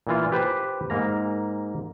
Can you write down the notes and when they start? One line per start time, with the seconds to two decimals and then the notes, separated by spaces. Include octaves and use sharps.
0.07 A#2 E3 F4
0.32 G4 B4 C5
0.90 G#2 A#3 A#5